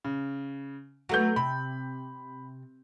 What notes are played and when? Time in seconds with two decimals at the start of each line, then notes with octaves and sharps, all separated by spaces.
0.04 C#3
1.09 F#3 A3 B3 F#4 G6
1.36 C3 B5